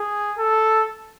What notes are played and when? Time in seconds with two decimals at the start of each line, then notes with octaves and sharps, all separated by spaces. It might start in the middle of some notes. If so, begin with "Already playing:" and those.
Already playing: G#4
0.38 A4